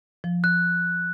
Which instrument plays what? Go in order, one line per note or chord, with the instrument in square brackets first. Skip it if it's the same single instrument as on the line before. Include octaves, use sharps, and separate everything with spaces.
[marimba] F3
[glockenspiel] F#6